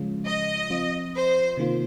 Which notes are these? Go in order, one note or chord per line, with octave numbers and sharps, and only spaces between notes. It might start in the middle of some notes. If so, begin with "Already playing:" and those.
Already playing: C#3 F3 G#3 C#4 F4
D#5
F3 C4 F4
C5
C3 D#3 A#3 F4